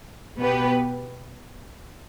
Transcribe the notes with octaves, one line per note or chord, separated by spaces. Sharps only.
B2 B3 G4 B4